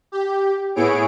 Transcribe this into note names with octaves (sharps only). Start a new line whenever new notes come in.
G4
A2 B3 E4 G#4 C#5 D7